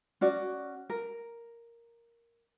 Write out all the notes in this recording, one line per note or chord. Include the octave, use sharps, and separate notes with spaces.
C#4 F#4 D5
A#4